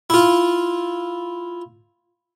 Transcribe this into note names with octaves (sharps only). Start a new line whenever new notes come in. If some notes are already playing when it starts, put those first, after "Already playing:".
E4 F4